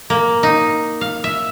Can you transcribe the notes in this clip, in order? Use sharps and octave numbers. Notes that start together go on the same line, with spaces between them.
A#3
D#4
F5
E5